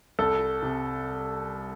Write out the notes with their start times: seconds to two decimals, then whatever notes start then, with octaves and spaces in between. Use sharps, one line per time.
0.19 C2 A4
0.62 C3